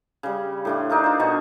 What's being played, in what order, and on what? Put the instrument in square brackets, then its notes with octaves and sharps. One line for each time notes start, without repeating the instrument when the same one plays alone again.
[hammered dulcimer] C#3 G3
A2 D4 C6
D4 D#4 A#4 F5
F4 C5
B2 D4 D#5 C#6